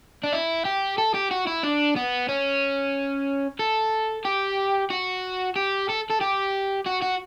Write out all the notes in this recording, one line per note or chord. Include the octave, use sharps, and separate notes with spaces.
D4
E4
G4
A4
G4
F#4
E4
D4
B3
C#4
A4
G4
F#4
G4
A4
A4
G4
F#4
F#4